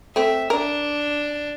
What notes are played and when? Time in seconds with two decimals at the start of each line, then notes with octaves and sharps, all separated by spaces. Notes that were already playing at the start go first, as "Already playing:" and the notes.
0.16 A3 C4 E5
0.50 D4 A#4